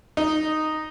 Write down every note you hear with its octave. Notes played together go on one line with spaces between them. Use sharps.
D#4